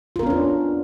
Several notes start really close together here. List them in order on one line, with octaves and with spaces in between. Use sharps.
F4 A#4 B3 C#4 D4